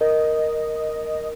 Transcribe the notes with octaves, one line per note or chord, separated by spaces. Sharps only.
A#4 D#5